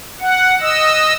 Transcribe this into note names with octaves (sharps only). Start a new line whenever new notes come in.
F#5
D#5 E6